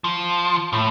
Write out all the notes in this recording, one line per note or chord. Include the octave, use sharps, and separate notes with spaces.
F3
A2